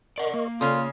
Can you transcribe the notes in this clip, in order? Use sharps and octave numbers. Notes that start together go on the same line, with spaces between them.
A#4 D5 D#5 F#5 C#6
A#3
C#3 C#4 F4 A4